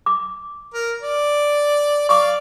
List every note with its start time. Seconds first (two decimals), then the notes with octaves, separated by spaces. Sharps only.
0.06 D6
0.74 A#4
1.02 D5
2.09 D5 F5 C#6 D6